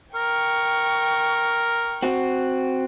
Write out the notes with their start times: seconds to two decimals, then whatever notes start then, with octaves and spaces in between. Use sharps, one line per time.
0.15 A#4 G5 C#6
2.02 C4 F#4